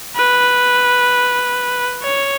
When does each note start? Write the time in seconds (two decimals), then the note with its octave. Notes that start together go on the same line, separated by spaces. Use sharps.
0.16 B4
2.03 C#5